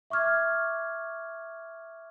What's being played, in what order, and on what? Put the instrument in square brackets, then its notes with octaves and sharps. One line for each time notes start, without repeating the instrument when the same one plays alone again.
[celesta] E5 C#6 D6 F6 G#6